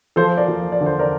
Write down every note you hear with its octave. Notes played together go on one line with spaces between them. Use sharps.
F3 A4 C5
A#4 D5
F3
D5
D3
C5
A#4 D5